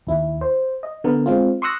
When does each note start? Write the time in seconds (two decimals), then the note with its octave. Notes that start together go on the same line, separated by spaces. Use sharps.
0.07 D#2 E4
0.41 C5
0.83 D#5
1.04 D3 B3 A#4
1.26 G#3 C4 F4
1.62 C6 C#6 D#6 E6 F#6 A#6